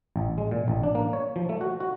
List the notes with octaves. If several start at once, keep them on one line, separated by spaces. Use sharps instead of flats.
A1
G#3
A#2
A1
D4
A#3
C#5
F3
A3
F#4
F#4